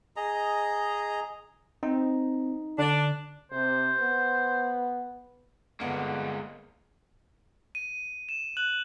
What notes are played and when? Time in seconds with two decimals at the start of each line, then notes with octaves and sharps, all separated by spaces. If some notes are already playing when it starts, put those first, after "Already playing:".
0.16 G#4 D#5 A#5
1.83 C4 D#4
2.78 D3 D4
3.52 C3 C5
3.99 B3
5.80 G1 G#3 A#3 B3 C#7
7.75 D#7
8.29 E7
8.57 F#6 F#7